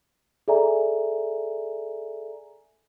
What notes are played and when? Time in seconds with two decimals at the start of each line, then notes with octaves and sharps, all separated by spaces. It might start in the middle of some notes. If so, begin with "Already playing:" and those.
0.48 G#4 A4 D5 E5 G#5 A#5